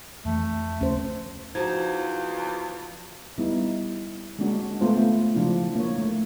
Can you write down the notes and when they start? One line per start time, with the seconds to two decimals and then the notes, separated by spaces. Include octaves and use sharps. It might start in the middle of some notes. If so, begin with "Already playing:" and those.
0.25 F2 E3 A3
0.81 D#2 C#3 F3 C#4 C5
1.55 E2 F3 D#4 F#4 G#6
3.38 G3 B3 D#4 E4
4.39 G#3 A#3 C#4 D4 F#4
4.81 A3 B3 F4 C5
5.35 C#3 F3 D4 E4 F4
5.75 A#3 C#5
5.98 A3